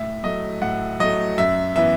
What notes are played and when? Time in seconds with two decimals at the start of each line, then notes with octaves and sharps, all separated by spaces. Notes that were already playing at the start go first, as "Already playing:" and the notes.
Already playing: A2 E5
0.24 F#3 A3 D#5
0.62 A2 F#5
1.00 F#3 A3 D#5
1.38 F#2 E5
1.76 E3 B3 E5